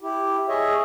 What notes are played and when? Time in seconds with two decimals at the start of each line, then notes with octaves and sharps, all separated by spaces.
0.01 E4 G4
0.49 G#4 C#5 D#5 E5